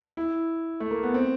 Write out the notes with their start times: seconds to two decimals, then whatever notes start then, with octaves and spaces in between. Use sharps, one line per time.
0.17 E4
0.80 A3
0.91 A#3
1.03 B3
1.14 C4